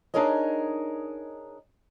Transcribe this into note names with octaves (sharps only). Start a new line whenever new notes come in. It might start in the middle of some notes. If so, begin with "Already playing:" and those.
D4 D#4 G#4 A#4 C#5 D#5